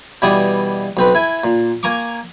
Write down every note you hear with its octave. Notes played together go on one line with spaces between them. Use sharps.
B2 E3 G3 D5 G#5 D#6
B1 C4 B4
E4 G#5
A#2
A#3 G#5 A#5 C#6 D6